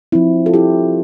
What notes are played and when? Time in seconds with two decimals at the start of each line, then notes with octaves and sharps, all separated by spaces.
0.12 F3 C4 E4
0.46 F4 A4
0.54 E4 G4